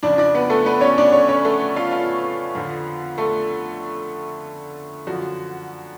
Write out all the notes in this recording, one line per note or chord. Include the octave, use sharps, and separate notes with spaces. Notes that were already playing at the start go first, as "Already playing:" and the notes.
F2 C#3 F3 D4 D5
D4 D5
B3 B4
A3 A4
B3 B4
C#4 C#5
D4 D5
C#4 C#5
C#4 C#5
A3 A4
F4 F5
F4 F5
F2 D3 F3
A3 A4
F#2 D3 F3 F#4